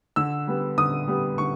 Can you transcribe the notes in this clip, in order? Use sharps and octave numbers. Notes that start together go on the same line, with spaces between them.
D3 E6
G3 B3
D3 D#6
G3 B3
D3 C#6